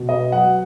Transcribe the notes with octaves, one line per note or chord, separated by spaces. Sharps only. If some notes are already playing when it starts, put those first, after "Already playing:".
Already playing: B2
B3 D#5
F#3 F#5